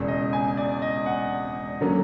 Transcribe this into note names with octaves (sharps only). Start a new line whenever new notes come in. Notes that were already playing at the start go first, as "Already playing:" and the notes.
Already playing: E1 E2 C#3
D#5
G#5
D5
D#5
F#5
D3 F#3 A#3 C#4